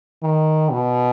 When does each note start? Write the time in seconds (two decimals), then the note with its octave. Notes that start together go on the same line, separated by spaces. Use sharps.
0.23 D#3
0.71 B2